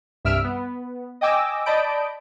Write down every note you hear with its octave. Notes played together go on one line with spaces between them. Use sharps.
C2 G2 E5 E6 F6 D7
B3
D#5 G5 G#5 D6 E6 A#6
D5 D#5 A5 B5 G6 D7